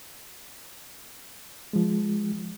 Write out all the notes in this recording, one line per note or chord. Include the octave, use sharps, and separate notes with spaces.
F3 G#3